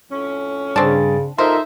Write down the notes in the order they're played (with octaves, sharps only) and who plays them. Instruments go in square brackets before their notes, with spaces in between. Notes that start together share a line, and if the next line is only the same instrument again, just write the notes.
[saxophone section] F2 A2 C#4
[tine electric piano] G2 G#4 A6 [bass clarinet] C#3 [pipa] C4 D4
[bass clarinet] D#4 [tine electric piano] F4 A#4 D#5 [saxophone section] A4 E5 [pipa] C5